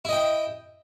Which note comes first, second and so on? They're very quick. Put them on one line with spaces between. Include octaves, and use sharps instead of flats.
E4 D#5 G5